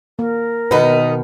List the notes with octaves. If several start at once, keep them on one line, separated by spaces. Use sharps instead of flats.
A#3 A#4
B2 D#3 B3 D#4 B4